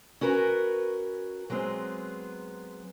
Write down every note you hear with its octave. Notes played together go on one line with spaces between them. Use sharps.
C#4 F#4 A#4 B4 C#5
F#3 G#3 B3 C4